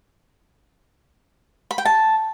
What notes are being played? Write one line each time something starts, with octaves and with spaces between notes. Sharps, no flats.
B5
G5
A5